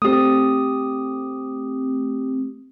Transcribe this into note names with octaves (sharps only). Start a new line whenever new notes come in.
A3 C4 G4 D#6